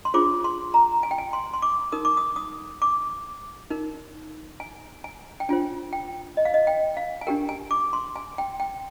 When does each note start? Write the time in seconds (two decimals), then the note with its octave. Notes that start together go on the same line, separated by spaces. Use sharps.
0.05 C6
0.14 D4 F4 G#4 C5 D6
0.44 C6
0.74 A#5
1.03 G#5
1.11 G5
1.18 G#5
1.33 C6
1.53 C6
1.62 D6
1.92 D#4 A#4 D#6
2.05 D6
2.17 D#6
2.36 D#6
2.82 D6
3.70 D#4 A#4
4.60 G#5
5.04 G#5
5.40 G5
5.49 D4 F4 C5 G#5
5.93 G5
6.37 D#5
6.45 F5
6.54 D#5
6.67 G5
6.97 F5
7.21 G#5
7.27 D4 G4 A#4 G5
7.49 G#5
7.71 D6
7.93 C6
8.16 G#5
8.38 G5
8.60 G5